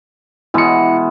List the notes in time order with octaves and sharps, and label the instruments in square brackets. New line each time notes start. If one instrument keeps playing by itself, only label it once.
[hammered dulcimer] B2 E3 G#3 [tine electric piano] E4 C#7